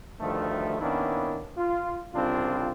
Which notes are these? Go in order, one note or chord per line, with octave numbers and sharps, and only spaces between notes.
D2 G2 D#3 F3 A3
D#3 A#3 B3 C#4 D4 E4
F4
C2 C#3 C4 D4 F4